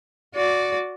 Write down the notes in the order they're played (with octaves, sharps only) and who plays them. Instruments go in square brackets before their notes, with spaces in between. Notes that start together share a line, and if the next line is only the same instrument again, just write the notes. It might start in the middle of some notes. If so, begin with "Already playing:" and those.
[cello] F#4 D5